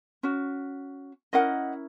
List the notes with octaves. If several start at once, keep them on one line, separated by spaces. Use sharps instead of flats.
C#4 F#4
C#4 E4 A#4 D#5 F#5